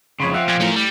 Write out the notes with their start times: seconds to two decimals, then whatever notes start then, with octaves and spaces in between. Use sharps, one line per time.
0.20 F2 C#3 C#5 B5 C6
0.34 F3 C4 E5 F#5
0.48 A#2 F6 F#6 G#6
0.60 A2 C#4 A#4 C#7
0.76 G3